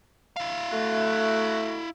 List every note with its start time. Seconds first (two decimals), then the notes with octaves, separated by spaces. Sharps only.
0.36 E4 F5
0.71 A3 F#4